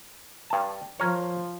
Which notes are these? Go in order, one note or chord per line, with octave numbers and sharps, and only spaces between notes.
G2 A5
F3 A#4 C#5